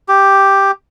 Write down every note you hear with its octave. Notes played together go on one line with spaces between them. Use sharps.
G4